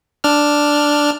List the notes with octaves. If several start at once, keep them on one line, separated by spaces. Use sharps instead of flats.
D4 F6